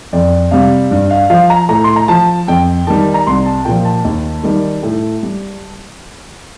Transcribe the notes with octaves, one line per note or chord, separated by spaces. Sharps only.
F2 D5
C3 G3 F5
G2
F5
F3 F5
A#5
A2 A#5
C6
A#5
F3 A5
F2 G5
D#3 G3 A5
A#5
C2 C6
A5
A#2 F3 G5
A5
D#2
D#3 G3
A2
G3